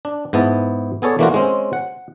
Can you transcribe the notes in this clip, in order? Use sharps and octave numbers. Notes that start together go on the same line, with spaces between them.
D4
G#2 B3 E4 A5
B3 G#4 A4 C#5 D5
E3 A3 A#3 D4 F4 F#4
G#3 C4 C#4
F#5